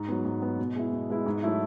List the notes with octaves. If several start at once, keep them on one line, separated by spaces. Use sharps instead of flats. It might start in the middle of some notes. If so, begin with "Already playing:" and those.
Already playing: G#2
F#3 B3
G#2
F#3 B3
B2
G#3 B3 E4
B2
G#3 B3 E4
G#2
F#3 A3 E4